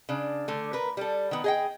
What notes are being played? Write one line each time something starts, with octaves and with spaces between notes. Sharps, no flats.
C#3 D4
D3 A3
A#4 B4
G3 A4
D#3 B3
G#4 D#5 G5